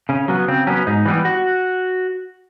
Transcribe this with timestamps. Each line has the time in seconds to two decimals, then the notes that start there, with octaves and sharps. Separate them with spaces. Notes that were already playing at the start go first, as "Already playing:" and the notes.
0.09 C#3 C#4
0.28 F#3 B3 C#4
0.48 C#3 C4
0.67 F#3 B3 C#4
0.87 G#2 D#4
1.06 E3 G3 B3
1.25 F#4